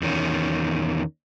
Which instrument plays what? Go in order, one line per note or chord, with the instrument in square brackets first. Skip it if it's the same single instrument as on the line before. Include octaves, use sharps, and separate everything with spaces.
[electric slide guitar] E2 D#3 C#4